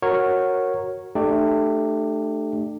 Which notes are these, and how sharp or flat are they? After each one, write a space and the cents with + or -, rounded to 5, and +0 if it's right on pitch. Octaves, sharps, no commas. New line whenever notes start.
F#4 +0 A#4 +0 C#5 -10
A3 +0 D4 +40 G4 +0